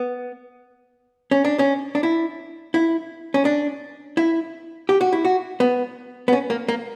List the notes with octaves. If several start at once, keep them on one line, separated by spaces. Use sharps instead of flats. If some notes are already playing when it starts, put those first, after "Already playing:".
Already playing: B3
C#4
D4
C#4
D4
E4
E4
C#4
D4
E4
G4
F#4
E4
F#4
B3
B3
C#4
A#3
A#3